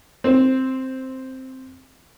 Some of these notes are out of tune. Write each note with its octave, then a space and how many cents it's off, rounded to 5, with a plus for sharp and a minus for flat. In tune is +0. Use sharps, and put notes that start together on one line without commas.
C4 +0 C5 +20